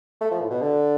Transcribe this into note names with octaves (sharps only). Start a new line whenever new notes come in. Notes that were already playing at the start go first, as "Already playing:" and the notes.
A3
F3
A2
B2
D3